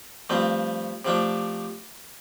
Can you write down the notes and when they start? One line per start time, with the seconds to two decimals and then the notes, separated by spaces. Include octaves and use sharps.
0.30 G2 F3 A3 C4
1.05 C3 F3 A3 D4